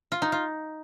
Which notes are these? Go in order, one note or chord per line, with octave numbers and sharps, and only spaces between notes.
F4
D#4
F4